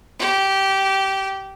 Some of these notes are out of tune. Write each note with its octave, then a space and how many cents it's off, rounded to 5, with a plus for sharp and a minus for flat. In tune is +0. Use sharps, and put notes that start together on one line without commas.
G4 -15